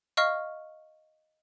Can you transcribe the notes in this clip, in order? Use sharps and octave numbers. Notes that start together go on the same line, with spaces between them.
D#5 F5 C#6 F6